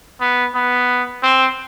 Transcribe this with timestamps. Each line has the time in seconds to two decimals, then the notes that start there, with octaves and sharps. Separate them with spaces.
0.21 B3
0.55 B3
1.23 C4